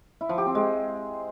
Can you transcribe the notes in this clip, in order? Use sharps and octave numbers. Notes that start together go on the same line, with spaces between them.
E4
F3
G4
C4
G#3